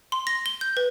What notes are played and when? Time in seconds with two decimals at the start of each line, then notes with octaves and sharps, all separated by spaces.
0.12 C6
0.27 A#6
0.46 G7
0.61 G6
0.77 B4